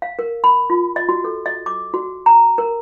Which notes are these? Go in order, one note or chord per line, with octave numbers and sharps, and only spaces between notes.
F5
A#4
B5
F4
D#5
F#4
A4
D#5
D6
F#4
A#5
A#4